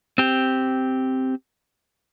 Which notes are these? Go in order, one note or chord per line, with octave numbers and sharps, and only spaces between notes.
C4 G4